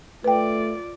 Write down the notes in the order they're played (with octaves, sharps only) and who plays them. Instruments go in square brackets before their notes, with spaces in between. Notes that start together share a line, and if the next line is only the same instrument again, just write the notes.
[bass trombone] A3 [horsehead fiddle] F4 D5 [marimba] B4 G5